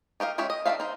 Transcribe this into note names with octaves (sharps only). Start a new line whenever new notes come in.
D#4 G4 A#4 F5
G#3 C#4 G4 C#5 E5
D#5
D#3 D4 D#4 E5 F5
D#4 C5